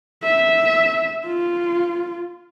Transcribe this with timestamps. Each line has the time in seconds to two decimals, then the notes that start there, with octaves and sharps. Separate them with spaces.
0.24 E5
1.27 F4